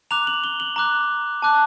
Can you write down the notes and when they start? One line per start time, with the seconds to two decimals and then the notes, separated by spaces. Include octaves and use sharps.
0.11 A#5 D6 F#6 F7
0.27 F#7
0.44 G7
0.60 F#7
0.76 A#5 D6 F#6
1.42 A5 D6 F#6